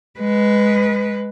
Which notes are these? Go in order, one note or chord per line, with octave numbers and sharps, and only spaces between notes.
G#3 B4